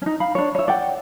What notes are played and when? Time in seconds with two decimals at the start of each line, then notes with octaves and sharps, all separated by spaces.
0.02 C#4 D#4
0.20 F5 B5
0.35 D4 C#5
0.55 C#5 E5
0.68 D5 F#5 G5